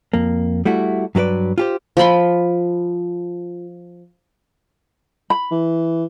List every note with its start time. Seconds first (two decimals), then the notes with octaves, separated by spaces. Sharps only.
0.13 F2 A#3
0.65 G3 A3 E4 F#4
1.15 G2 F#3 D#4 B4 D5
1.58 F4 G4 C5
1.97 F3 F4 B5 C6
5.30 B5
5.51 E3